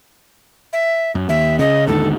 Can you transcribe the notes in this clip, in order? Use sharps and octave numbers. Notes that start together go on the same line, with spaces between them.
E5
F#2
D#2 E5
C#3 D#5
D#2 G#2 D3 A4